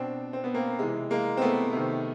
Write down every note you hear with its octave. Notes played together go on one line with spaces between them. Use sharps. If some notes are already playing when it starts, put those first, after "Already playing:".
Already playing: B2 C4 D4
C4
B3
A#3 C4
C3 E3 G#3
G#3 A#3
C4
A3 B3
C3 D#3